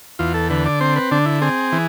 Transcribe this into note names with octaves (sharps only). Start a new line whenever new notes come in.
E2 F4
A4
D3 B4
D5
C4 C5
B4
D3 D4
E4
C4 G#4
E3